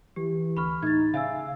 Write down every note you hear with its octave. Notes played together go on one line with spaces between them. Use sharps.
E3 G4
D2 B5 C#6 F6
A2 D#4 G#6 A6
C#3 E5 F5 G#5 E6